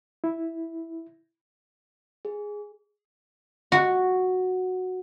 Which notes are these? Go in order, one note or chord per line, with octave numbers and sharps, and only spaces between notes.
E4
G#4
F#4